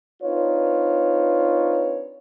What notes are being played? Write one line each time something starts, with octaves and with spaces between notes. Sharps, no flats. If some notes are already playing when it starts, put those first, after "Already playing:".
C4 D4 D#4 F4 B4 C#5